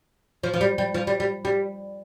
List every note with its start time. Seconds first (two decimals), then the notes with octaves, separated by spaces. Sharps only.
0.43 F3
0.54 F3
0.61 G3
0.78 G3
0.94 F3
1.07 G3
1.20 G3
1.45 G3